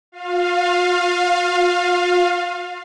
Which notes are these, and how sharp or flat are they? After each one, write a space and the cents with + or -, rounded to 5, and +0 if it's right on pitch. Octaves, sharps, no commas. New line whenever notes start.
F4 +40 F5 +0